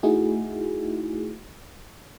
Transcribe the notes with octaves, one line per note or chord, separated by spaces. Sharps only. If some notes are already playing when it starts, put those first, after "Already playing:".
A3 D#4 E4 F#4 G#4